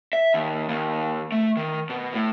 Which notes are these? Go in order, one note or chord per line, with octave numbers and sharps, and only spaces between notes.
E5
D#2
D#2
A3
D#3
B2
A2